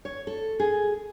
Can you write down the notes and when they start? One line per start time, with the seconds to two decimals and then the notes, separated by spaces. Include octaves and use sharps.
0.05 C#5
0.27 A4
0.60 G#4